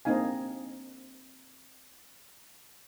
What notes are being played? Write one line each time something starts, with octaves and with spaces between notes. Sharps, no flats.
A#3 C4 D4 D#4 F5 G#5